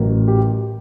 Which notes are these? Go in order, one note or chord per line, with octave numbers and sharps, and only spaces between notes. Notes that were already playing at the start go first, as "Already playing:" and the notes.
Already playing: A1 A2 F#3 A#4
G4